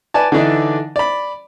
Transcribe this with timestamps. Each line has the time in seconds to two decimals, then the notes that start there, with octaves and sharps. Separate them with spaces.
0.14 B4 D5 G#5 A5
0.32 D3 E3 D4 D#4
0.96 D5 B5